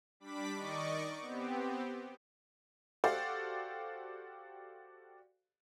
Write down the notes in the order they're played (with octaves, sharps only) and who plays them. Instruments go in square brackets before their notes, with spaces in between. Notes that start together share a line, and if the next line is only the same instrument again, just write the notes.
[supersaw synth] G3 D4 B5 D6 B6
D#3 D5 D#5 C#6 D6
B3 C4 G4
[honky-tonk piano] F#4 G4 A4 C5 D5 F5